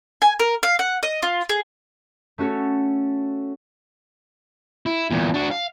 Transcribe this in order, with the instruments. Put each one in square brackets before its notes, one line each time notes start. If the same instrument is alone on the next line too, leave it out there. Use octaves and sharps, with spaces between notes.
[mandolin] G#5
A#4
F5
F#5
D#5
F4
G#4
[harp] A3 C#4 F#4 A4 C#5
[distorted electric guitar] E4
E2 A#2
D4 F#4
F5